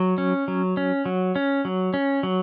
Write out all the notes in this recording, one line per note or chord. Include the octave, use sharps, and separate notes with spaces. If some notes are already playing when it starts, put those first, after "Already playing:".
Already playing: F#3
C#4
F#3
C#4
F#3
C#4
F#3
C#4
F#3